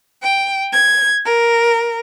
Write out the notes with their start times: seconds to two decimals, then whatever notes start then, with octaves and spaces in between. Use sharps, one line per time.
0.23 G5
0.72 G#6
1.25 A#4